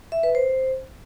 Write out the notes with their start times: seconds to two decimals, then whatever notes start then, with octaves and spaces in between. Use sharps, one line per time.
0.12 E5
0.23 B4
0.35 C5